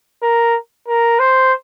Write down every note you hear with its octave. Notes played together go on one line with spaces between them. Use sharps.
A#4
A#4
C5